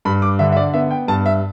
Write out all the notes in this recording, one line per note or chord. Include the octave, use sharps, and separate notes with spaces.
G2 B5
D6
D3 E5
E5
D5
B3 E5
G5
G2 A5
E5